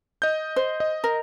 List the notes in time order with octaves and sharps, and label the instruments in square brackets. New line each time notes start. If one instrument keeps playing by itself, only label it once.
[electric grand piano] D#5 G6
[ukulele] C5
[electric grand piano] D#5
[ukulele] A#4